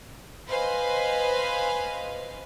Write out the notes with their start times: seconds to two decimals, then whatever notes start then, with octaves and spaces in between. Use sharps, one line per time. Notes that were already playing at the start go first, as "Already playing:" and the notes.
0.49 B4 C5 D#5 F5 G#5